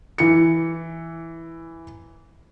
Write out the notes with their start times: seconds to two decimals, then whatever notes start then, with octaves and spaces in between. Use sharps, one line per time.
0.18 E3 C#7